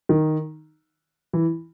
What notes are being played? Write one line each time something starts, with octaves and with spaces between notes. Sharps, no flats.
D#3
E3